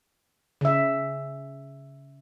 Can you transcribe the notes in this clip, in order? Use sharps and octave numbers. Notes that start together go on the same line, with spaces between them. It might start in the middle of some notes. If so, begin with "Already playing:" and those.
C#3 E5